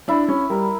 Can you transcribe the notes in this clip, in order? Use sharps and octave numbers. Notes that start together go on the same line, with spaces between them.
D4 E4
C#4
G3 A#4